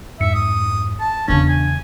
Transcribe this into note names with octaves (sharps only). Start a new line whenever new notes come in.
F2 G#2 E5 C#7
D#6
A5
E2 C#3 C#4 D4
G#5